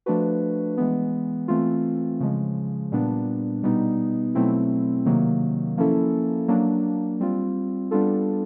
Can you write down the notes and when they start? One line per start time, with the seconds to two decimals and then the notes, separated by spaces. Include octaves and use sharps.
0.06 F3 A3 D4 F#4 B4
0.77 E3 G#3 B3
1.48 E3 A3 C4 F4
2.20 C#3 F3 G#3
2.92 A#2 G3 B3 D4
3.63 B2 G3 B3 D#4
4.35 B2 F#3 A3 C4 E4
5.06 C3 D#3 F#3 A#3
5.77 F3 A#3 C#4 E4 A4
6.48 F#3 A#3 D4
7.20 G3 C4 F4
7.91 G3 B3 D4 F4 A4